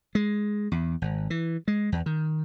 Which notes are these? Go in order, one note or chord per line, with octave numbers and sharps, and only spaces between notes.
G#3
E2
G#1
E3
G#3
E2
D#3